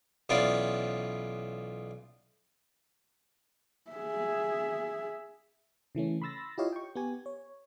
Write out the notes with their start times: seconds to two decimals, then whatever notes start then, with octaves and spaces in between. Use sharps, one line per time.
0.29 B1 E3 B3 C#4 F4 D5
3.91 G#4 E5
5.95 C#3 E3 A3 C#4
6.22 B5 C6 E6 A6 A#6
6.58 E4 F4 G4 C#5 D#5 F5
6.73 G5 C#6
6.95 B3 G4 G#5
7.26 C#5